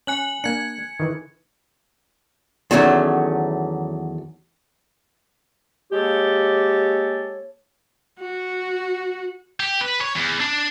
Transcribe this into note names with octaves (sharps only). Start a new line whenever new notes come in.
C#4 G#5 F#6 F#7
A#3 D4 G#6 C#7
D#3 E3
E2 D#3 F#3 A3 C#4
G#3 A#3 G4 A4 C#5
F#4
G4
B4
C#5
E2
D4